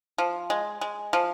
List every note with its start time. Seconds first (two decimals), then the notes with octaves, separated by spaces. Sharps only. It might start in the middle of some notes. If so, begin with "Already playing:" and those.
0.18 F3
0.50 G#3
0.81 G#3
1.13 F3